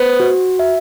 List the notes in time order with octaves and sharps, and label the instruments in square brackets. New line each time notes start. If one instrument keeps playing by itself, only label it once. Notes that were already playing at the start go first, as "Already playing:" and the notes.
Already playing: [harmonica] B3 [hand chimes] C5
[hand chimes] F#4
E5